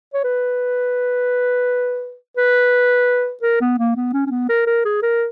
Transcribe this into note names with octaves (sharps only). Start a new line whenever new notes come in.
C#5
B4
B4
A#4
B3
A#3
B3
C#4
C#4
B3
A#4
A#4
G#4
A#4